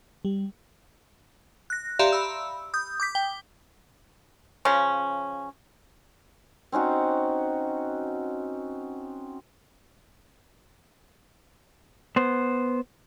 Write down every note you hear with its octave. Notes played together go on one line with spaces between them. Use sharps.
G3
F#6 A#6
G4 D5 E5 F5 A#5 C6
B5 E6
D#6 G6
D6 G6 B6
G5
C#3 F3 C#4
C4 C#4 D#4 F#4
B3 C5